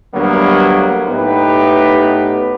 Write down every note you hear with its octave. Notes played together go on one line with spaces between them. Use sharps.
D2 D3 F#3 G3 A#3 B3
A2 B3 D#4 G4 B4